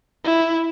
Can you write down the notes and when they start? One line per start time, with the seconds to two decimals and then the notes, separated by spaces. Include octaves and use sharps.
0.24 E4